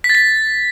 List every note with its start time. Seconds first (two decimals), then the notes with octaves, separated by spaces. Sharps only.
0.04 B6
0.10 A6
0.15 B6